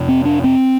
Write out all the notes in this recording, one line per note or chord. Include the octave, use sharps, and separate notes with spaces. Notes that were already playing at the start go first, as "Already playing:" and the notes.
Already playing: F2 C3
C4
D4
C4